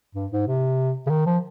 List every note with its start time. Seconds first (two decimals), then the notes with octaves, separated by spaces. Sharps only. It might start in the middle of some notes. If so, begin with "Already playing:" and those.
0.15 G2
0.32 G#2
0.48 C3
1.07 C#3
1.10 D#3
1.26 F3